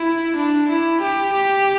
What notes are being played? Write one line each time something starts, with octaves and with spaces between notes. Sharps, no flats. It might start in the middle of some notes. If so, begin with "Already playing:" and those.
Already playing: E4
D4
E4
G4
G4